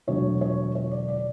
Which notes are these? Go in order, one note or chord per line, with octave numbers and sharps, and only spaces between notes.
E1 D2 D3 F#3 C#5
C#5
C#5
D5
D5